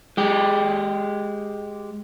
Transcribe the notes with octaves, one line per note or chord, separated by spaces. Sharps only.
G#3 G4